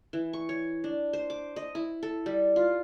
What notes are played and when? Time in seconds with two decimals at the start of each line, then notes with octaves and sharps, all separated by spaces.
0.13 E3
0.33 C#6
0.49 C#5
0.84 D4
1.13 C5
1.30 D6
1.56 D#5
1.75 E4
2.03 A4
2.26 G3
2.56 F4